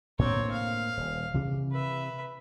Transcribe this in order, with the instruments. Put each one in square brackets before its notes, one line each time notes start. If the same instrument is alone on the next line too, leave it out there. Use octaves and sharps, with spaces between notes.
[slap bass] A2 A#3 D4 [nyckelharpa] C4 C#5
[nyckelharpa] F5
[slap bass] D#1
C3 E3
[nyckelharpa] B4 E5